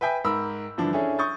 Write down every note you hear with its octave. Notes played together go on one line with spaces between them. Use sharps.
B4 E5 G5 G#5 G6 B6
G#2 A#4 B5 E6
G2 D3 E3 F3 D4
C#4 D4 E4 G#4 A4
C#6 D#6 G6 A6